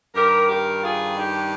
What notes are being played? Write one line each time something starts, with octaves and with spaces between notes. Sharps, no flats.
G2 D#3 G4 A#4
G4 A#4
F4 G#4
D#4 G4